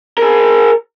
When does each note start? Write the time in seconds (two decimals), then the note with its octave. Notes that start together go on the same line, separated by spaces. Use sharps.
0.18 G#4 A#4